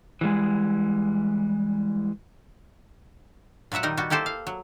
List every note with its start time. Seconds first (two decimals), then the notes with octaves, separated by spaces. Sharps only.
0.21 E3 G3 G#3
3.72 A#2 F#3 B4 E5 F#5
3.83 D#3 G3 D#4 A#4
3.97 G3 B3 F#4
4.10 A#3 E4 G4 A4 C5
4.26 F5
4.47 F#3